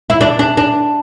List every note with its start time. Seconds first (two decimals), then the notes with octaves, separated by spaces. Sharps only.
0.10 E4
0.21 D4
0.39 D4
0.57 D4